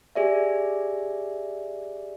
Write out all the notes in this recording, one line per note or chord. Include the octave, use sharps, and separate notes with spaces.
G4 G#4 D5 E5